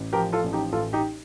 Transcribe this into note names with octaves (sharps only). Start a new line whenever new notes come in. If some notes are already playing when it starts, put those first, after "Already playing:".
Already playing: A1
F3 G4 A#4
F4 A4
A1
D#4 G4
A1 F4 A4
D#4 G4